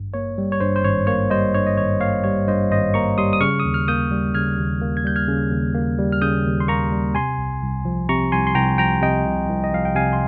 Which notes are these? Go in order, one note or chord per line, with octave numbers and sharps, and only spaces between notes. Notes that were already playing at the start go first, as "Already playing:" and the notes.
Already playing: G#1 G2
A#3 C#5
G3
C#5
G2 C5
C5
G#1 C#5
A#3 C#5
G3 C5 D#5
G2 C#5
D#5
G#1 C#5
A#3 C#5 F5
G3 C#5
G2 C5 D#5
G#1 C5 D#5
A#3 A#5 C#6
G3 C6 D#6
D#6
C#3 C#6 F6
D#6
D#2
F6
A#3 D#6 G6
G3
C#3 F6 G#6
D#2
A#3
G#6
G3 G6
F6 G#6
C#3
D#2
A#3
G3
F6
C#3 D#6 G6
D#2
C6
A#3 A#5 C#6
G3
C3 G#5 C6
C2
C2
F3
C3 A#5 C#6
C2 G#5 C6
C6
C2 G5 A#5
F3 G5 A#5
C3 D#5 G5
C2
C2
D#5
F3 F5
G5
C3 F5 G#5
C6